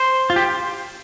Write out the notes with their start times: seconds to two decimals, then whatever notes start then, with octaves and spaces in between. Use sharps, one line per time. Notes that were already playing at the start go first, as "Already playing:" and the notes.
Already playing: C5
0.30 F4
0.36 G4